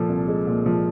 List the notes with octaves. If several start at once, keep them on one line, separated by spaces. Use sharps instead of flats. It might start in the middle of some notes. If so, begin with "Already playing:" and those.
Already playing: A#2 F3 A4
C2
G#3
A#2
F3